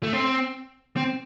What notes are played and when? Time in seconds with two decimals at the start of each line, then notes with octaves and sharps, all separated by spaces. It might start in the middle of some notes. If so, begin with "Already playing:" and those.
0.03 A3
0.13 C4
0.97 C4